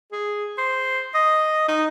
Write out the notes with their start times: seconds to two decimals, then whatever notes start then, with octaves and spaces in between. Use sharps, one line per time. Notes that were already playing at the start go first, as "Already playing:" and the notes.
0.12 G#4
0.58 C5
1.14 D#5
1.68 D#4